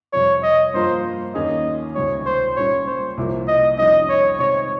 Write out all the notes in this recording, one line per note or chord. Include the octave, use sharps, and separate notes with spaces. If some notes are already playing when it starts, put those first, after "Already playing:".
F2 C3 G3 C#5
D#5
G2 F3 A#3 F4 A#4 C5
D#2 D#3 A#3 C#4 G#4 D#5
C#2 C3 D#3 G3 C#5
C5
A#2 G3 A#3 C#4 C#5
C5
C2 C3 F3 A#3
D#5
F2 D#3 G3 C#4 D#5
C#5
C3 D#3 G#3 C4 C#5